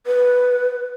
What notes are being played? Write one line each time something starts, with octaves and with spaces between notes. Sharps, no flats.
B4